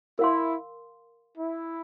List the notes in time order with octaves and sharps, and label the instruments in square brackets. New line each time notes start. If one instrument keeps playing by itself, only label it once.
[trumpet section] E4 [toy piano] A#4 F5 C6
[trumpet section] E4